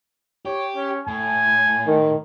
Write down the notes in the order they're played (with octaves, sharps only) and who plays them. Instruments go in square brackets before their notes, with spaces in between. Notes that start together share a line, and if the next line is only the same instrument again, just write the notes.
[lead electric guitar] G4 [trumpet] C#5
[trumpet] C#4
[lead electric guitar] A2 [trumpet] G#5
[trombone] D#3